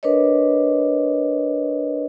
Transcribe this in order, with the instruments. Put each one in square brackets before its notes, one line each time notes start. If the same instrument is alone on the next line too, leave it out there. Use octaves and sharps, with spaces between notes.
[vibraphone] D4 A#4 B4 C#5 D#5